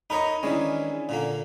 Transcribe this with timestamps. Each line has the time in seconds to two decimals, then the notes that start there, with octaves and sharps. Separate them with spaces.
0.10 D#4 A#4 C#5 D#5 B5
0.43 D#3 E3 G#3 C#4 D4 E4
1.09 A#2 D3 A#3